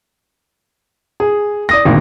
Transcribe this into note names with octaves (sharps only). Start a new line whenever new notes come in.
G#4
D5 D#6 A#6
G#1 D2 A#2